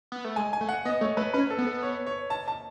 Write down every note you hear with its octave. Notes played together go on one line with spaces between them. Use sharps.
B3
A3
G#3 G#5
G#5
A3
F#5
B3 D#5
A3 C#5
A3 B4
C#4 B4
A4
B3
A4
C#5
C#5
A5
A5